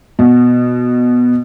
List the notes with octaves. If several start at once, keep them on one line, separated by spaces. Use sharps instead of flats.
B2